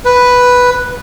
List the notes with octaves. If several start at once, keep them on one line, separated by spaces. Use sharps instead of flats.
B4